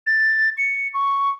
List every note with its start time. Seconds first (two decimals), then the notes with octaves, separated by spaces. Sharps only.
0.07 A6
0.58 C#7
0.94 C#6